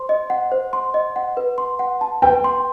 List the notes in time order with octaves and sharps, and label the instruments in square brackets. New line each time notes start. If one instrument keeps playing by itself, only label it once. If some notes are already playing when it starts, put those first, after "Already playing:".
Already playing: [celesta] C5 C6
D#5
F#5
C5
C6
D#5
F#5
B4
C6
F#5
A5
[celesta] B4 [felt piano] G5
[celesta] C6